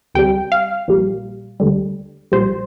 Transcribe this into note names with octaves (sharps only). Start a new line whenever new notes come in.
D2 C3 G3 G5
F5
A#1 A#2 G3
D2 D3 G3
A#1 A#2 G3 C5